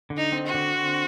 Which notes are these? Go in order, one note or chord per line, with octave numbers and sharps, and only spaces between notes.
D3
D#4
C4
F#4
D3
C4